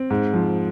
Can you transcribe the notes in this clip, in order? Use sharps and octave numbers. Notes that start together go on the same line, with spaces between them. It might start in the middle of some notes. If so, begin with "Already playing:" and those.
Already playing: C4
G#2
F3